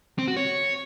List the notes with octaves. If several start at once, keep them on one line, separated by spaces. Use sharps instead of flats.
C4
F#4
C#5